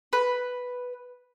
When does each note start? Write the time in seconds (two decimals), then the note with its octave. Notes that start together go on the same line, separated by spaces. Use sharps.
0.13 B4